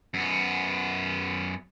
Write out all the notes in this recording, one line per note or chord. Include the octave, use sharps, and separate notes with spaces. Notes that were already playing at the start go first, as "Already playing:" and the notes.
F#2 B3